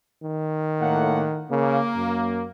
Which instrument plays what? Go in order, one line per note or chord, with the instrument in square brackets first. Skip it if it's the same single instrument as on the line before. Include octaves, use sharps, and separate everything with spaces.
[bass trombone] D#3
[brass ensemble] A2 A#3 F#5
[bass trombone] C#3 [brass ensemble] A#3
[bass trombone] F#2